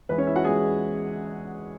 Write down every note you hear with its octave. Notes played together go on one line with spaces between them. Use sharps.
E2 E3 G#3 B4
C#4 C#5
E4 E5
F#4 F#5
E2 E3 G#3 G#4 G#5